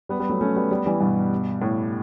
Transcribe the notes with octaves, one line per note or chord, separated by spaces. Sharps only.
G3 B3
G3 B3
F#3 A3
A3 C#4
G3 B3
G3 B3
E3 G3
G2 B2
A2